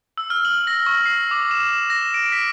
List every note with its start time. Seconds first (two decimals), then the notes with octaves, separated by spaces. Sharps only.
0.18 E6
0.30 F6
0.45 F#7
0.67 A#6
0.86 C#6
1.06 C7
1.31 D6
1.51 E7
1.69 E7
1.90 A#6
2.14 D7
2.32 B6